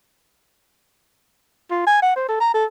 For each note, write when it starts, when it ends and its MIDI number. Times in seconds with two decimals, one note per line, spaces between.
1.71 1.84 65
1.86 1.99 80
2.02 2.15 78
2.16 2.25 72
2.29 2.39 69
2.40 2.52 82
2.54 2.65 69